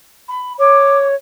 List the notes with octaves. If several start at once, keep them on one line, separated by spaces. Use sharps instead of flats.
B5
C#5 D6